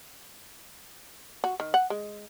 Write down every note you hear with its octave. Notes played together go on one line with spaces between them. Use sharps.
F#4
D#3
F#5
G#3